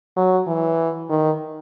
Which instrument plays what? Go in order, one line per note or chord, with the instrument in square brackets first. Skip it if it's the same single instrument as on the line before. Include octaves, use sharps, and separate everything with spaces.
[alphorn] F#3
E3
D#3